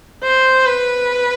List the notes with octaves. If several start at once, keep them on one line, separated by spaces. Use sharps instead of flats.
C5
B4